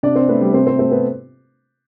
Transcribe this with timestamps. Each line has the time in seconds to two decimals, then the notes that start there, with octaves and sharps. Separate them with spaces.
0.03 C3 D4 D5
0.16 C4 C5
0.29 A3 B3 B4
0.41 G3 G4
0.53 C3 C4 C5
0.66 C4 C5
0.79 A3 C4 C5
0.91 B3 B4